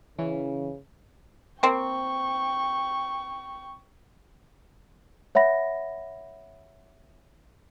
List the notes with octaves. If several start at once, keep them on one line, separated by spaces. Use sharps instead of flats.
C#3 E3 C#4
A#3 C4 G5 C#6
C#5 E5 F#5 B5 A#6